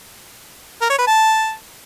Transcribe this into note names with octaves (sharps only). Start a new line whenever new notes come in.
A#4
C#5
B4
A5